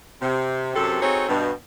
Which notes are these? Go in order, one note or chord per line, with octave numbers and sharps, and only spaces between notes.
C3
F#2 C3 A4
C4 D#4 F#4 G#4 A4 C#5
G2 B2